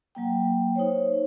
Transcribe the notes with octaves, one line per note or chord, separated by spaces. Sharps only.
F#3 A#3 G5
D#4 C5 C#5